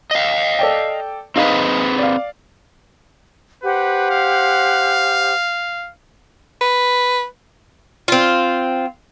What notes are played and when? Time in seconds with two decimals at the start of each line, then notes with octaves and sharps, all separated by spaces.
0.11 D#5 F5
0.59 A4 D5 G5
1.36 C4 D#4 G#4 B4 F5
1.99 D5 F5
3.63 G4 B4 C5 F#5
4.11 F5
6.61 B4
8.08 C4 F4